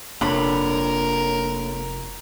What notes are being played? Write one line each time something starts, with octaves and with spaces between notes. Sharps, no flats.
F1 A#3 D4 A4 A#4 C#5 B5